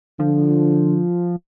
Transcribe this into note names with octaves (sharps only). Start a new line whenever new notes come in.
D3 F3